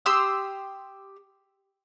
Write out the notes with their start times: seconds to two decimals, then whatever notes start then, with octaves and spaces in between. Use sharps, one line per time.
0.06 G4 C6 D#6 E6